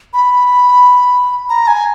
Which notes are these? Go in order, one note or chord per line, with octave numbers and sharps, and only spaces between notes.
B5
A#5
G#5